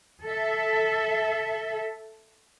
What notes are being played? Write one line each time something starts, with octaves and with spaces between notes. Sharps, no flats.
A4 E5